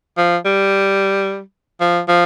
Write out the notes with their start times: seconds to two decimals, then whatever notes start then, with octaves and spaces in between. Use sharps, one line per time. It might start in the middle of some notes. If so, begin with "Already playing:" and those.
0.18 F3
0.45 G3
1.81 F3
2.08 F3